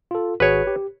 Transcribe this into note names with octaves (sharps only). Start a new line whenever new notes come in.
F4 A4
G#1 F#4 G#4 B4 C#5
G4